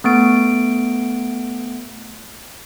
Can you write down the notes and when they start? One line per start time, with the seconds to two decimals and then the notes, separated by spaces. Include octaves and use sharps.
0.04 A3 B3 D7